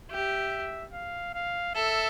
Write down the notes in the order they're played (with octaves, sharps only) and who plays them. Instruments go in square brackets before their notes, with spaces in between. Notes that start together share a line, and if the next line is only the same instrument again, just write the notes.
[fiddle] G4 [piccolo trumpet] E5
[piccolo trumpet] F5
F5
[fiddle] A4 [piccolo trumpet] E5